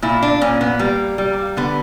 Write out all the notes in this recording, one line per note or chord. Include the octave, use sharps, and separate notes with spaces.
A#2 E4
D4
A#2 C#4
B3
G3 A#3
G3
D3 B3